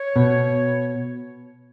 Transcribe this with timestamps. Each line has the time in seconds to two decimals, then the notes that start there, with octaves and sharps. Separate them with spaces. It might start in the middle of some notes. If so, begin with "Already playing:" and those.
Already playing: C#5
0.16 B2